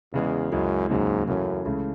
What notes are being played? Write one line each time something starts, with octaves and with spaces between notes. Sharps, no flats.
E2 C#3 E3 G#3
C#2 F#2 C#3 E3 G#3
D#2 G#2 C#3 F#3
F#2 C#3 E3 A3 C#4
C#2 C#3 E3 A3 E4